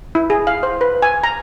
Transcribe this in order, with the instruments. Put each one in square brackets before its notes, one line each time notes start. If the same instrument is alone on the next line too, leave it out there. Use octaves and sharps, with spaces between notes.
[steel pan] E4
G#4
F5
C5
B4
G#5
A#5